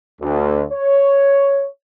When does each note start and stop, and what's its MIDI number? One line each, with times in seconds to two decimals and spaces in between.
0.21 0.64 38
0.72 1.66 73